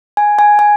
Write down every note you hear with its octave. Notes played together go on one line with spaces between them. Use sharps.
G#5
G#5
G#5